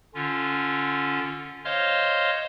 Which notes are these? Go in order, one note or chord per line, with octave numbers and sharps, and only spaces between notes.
D3 C#4 F4
C5 C#5 D#5 F5 C6 F6